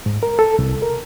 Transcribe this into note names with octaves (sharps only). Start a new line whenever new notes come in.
G#2
A#4
A4
C2
A#4